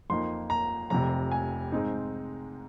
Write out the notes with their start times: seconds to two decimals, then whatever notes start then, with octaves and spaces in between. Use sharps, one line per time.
0.10 F2 F3 A#3 D#4 C6
0.50 A#5
0.90 F1 F2 C3 A#5
1.31 G#5
1.72 G#2 G#3 C4 D#4